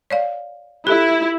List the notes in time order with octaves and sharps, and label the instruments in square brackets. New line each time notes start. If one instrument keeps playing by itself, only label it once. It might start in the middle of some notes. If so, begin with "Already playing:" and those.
[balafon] C#5 D5 F5
[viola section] E4 [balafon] G4 A4